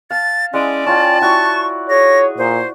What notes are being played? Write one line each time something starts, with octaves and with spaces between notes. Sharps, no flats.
F5 A5 A6
G#3 C#4 E4 D5 D#6
C#4 F4 G5 A5
E4 F#4 D5 C#6
G#4 C#5 A#6
A#2 C5